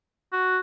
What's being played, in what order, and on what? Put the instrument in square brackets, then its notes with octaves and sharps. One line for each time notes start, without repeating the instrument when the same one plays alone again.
[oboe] F#4